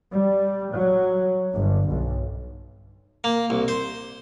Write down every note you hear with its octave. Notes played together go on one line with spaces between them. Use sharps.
G3
F#3
G1
B1
A#3
C2
C5